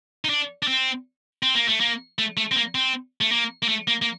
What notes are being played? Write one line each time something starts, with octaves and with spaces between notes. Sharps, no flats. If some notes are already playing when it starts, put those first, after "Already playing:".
D#4
D4
D4
C4
C4
A#3
A3
A#3
A3
A3
C4
A#3
C4
A3
A#3
A#3
A3
A#3
A#3